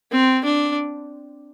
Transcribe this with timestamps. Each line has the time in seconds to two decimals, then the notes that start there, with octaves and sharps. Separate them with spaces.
0.11 C4
0.45 D4